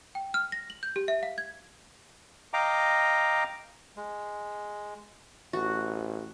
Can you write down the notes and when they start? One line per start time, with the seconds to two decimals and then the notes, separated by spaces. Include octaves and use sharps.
0.15 G5
0.34 F6
0.52 A#6
0.70 F#7
0.83 G6
0.96 G4
1.08 E5
1.23 F5
1.38 G#6
2.53 D#5 F5 G5 A#5 D6
3.97 G#3
5.53 A1 F#4